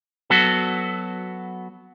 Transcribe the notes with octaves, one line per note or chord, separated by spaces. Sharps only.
F#3 B3 F#4 A4